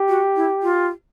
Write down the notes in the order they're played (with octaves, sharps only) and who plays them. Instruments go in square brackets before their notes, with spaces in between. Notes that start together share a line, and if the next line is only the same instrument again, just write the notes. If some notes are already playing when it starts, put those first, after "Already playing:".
Already playing: [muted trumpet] G4
[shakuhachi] F#4
E4
F4